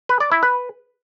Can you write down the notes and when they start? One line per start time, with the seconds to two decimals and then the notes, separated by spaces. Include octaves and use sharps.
0.09 B4
0.20 D5
0.32 E4
0.43 B4